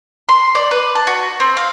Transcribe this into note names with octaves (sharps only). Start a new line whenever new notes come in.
C6
D5
B4
A5
F#4
C4
F5